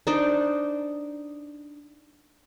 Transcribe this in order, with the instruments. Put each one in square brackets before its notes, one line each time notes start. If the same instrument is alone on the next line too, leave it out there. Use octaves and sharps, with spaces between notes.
[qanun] D4 D#4 C5 D5